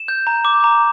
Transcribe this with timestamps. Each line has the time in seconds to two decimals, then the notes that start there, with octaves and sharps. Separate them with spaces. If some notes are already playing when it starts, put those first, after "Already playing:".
Already playing: E7
0.08 G6
0.27 A#5
0.45 D6
0.64 A#5